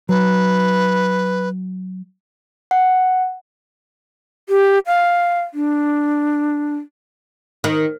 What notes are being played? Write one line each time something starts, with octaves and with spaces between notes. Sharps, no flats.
F#3 B4
F#5
G4
F5
D4
D#3